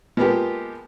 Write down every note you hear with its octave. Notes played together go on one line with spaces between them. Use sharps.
F3 G#3 A#3 B3 F4 G4